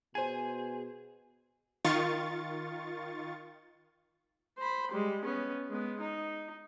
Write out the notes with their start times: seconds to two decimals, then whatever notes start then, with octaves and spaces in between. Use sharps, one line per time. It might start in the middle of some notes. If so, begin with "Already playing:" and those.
0.15 B2 G#4 C5 G#5 D#7
1.85 D#3 F4 C#6 A6
4.58 C5 B5
4.92 G3 G#3
5.25 B3 C#4
5.69 G#3 B3
6.00 D#4